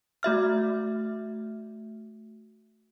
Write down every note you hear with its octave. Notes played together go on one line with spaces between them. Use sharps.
A3 F#4 E5 F6